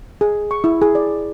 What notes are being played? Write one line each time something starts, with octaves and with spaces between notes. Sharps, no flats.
G#4
C#6
E4
G#4
D5